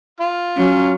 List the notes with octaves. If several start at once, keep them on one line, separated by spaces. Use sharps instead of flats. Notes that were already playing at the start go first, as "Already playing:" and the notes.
F4
F#3 C#4